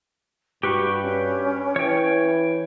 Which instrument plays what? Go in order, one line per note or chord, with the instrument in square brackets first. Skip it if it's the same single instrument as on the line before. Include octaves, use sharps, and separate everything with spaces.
[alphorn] G2 [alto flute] F#4 [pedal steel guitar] G4 B4 C#6
[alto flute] C#4
[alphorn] E3 [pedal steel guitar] C#5 G5